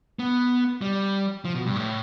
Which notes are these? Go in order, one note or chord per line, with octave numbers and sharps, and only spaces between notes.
B3
G3
F3
B2
G2
A2